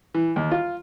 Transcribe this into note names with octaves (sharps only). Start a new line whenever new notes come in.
E3
D#2
F4